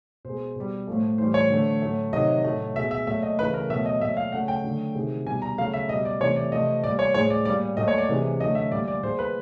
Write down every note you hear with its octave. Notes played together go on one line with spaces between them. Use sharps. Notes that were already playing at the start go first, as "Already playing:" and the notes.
B2 G#3 C5
B2 G3
A2 F3 A3
A2 E3 G3 C5
C#5
D3 F3 A3
A2 F#3 A3
C3 D#3 F#3 D#5
A2 F#3 A3
B2 G#3 E5
E5
A#2 F#3 A3 E5
D#5
C#3 E3 A3 B4
A#4
B2 F#3 A3 E5
D#5
A#2 F#3 A3 E5
F5
C#3 F#3 A3 F#5
G5
D3 F#3 A3
C3 D#3 G#3
B2 G3 G#5
A#5
C#3 F#3 A3 F5
E5
B2 G3 D#5
D5
C3 E3 A3 C#5
D5
C3 F3 A3 D#5
A#2 G3 D5
C#5
A2 F3 G#3 C#5
D5
A#2 G3 D5
A#2 F#3 A3 D#5
C#5
D5
C3 E3 G#3
D3 F#3 A3 D#5
E5
A#2 G3 D5
D5
A#2 F3 G#3 C5
B4